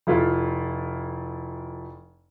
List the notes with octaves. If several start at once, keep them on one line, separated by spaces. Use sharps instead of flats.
F1 E4 F4